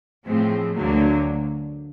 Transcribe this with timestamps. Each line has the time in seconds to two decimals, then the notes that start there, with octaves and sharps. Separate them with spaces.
0.25 A2 F3 G#3 C4
0.75 D2 D3 F#3 A#3